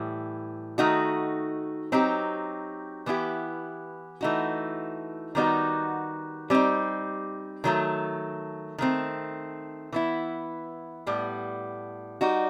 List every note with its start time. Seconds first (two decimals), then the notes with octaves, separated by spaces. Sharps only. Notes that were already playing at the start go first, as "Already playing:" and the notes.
Already playing: A2 E3 G3
0.78 D#3 A3 D#4 F#4
1.92 F#3 C4 D#4 G4
3.06 E3 B3 E4 G4
4.21 E3 A3 D#4 F#4
5.35 D#3 G3 B3 D#4 F#4
6.50 G3 C4 D#4
7.64 D#3 F#3 A3
8.78 D#3 A3 C4
9.93 E3 B3 E4
11.07 A2 G3 B3
12.21 G3 D#4 F#4